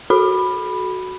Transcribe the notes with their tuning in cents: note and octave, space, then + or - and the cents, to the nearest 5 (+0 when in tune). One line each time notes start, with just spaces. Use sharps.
F#4 +0 A4 -40 B5 +0